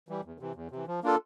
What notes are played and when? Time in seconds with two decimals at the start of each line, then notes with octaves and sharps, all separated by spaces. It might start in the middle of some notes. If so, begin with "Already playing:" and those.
0.09 E3 G3
0.25 E2
0.40 C3 E3
0.55 E2
0.71 C3 E3
0.87 F3
1.03 A#3 D4 F4 A4